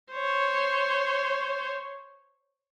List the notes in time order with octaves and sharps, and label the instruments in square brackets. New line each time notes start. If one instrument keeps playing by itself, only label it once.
[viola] C5 C#5